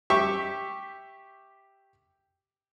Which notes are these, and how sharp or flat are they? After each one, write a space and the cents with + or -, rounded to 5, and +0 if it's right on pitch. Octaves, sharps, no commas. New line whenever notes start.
G4 +0 E5 +0 C#6 -5